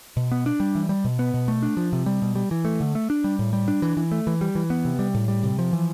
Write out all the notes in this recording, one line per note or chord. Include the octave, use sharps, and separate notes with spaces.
B2
B3
D4
G3
E3
G3
B2
B3
B2
A3
D4
F3
C3
G3
B2
G3
E3
A3
D3
A3
D4
G3
A2
G3
D4
E3
E3
A3
E3
G3
E3
B3
C3
G3
A2
G3
C3
F3
E3